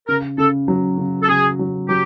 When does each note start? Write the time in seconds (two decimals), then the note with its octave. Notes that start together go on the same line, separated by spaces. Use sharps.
0.08 C#3 A#4
0.38 C#3 A4
0.68 F#3
0.98 C#3
1.23 A4
1.29 C#3 G#4
1.59 F#3
1.89 F#3 G4